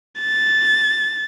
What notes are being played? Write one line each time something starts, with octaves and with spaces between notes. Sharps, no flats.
A6